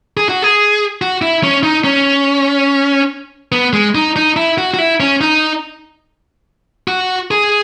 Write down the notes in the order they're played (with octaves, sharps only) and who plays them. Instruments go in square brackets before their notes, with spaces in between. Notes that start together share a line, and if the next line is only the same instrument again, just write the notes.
[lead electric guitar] G#4
F#4
G#4
F#4
E4
C#4
D#4
C#4
B3
G#3
D#4
D#4
E4
F#4
F#4
E4
C#4
D#4
F#4
G#4